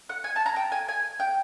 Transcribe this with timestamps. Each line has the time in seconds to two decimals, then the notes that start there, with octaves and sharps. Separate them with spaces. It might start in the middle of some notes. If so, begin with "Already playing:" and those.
0.09 F#5
0.24 G#5
0.36 A5
0.46 A#5
0.56 G5
0.72 G#5
0.88 G#5
1.20 G5